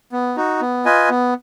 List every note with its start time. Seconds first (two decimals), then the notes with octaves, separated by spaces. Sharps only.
0.12 B3
0.37 D#4 F#4
0.61 B3
0.85 F4 B4 D#5 G#5
1.10 B3